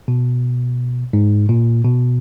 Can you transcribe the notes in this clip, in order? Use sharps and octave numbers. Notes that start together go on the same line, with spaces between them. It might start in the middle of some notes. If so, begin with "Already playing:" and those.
B2
G#2
A#2
B2